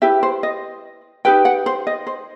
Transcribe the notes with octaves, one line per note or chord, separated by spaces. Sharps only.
E4 G4 B4 E5
C5
D#5
D#4 G4 B4 G5
F#5
C5
D#5
C5